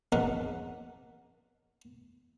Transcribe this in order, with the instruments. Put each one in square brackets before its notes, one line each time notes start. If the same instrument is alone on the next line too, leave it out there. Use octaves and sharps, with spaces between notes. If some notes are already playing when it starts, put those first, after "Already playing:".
[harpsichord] F2 A#2 C#3 D#4 A#4 F#5